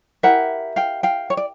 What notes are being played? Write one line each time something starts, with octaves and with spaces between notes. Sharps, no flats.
E4 G4 A#4 E5 F#5
F5 G5
F5 G5
C#5
D5